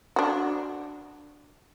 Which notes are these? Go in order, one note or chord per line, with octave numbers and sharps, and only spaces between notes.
D4 F#4